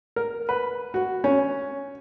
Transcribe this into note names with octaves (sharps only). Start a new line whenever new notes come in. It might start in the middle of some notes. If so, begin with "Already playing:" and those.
A#4
B4
F#4
C#4